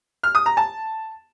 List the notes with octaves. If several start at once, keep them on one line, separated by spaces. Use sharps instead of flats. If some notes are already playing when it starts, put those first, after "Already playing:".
F6
D#6
A#5
A5